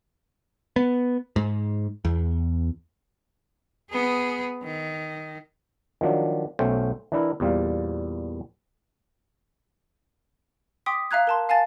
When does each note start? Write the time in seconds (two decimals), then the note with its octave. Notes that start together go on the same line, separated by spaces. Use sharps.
0.76 B3
1.36 G#2
2.05 E2
3.90 B3 G#4
4.64 D#3
6.01 D#3 F3 F#3 D4
6.59 B1 A3 C#4 C5 G5
7.12 E3 D4 E4 A#4
7.40 E2 A#2 G3 C5 F5
10.86 G5 C6 D6 D#6 B6
11.11 E5 F5 A#5 F#6 G#6
11.27 A#4 A5 C6
11.49 F5 G#5 A5 A6